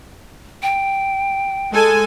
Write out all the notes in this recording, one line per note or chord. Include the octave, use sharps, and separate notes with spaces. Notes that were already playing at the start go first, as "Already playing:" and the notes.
G5
G#3 A4 G#5